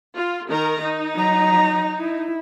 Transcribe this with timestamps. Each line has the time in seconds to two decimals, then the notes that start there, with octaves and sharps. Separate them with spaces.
0.16 F4
0.49 D#3 A#4 A#5
0.81 D#4
1.15 F#3 A#5
2.00 E4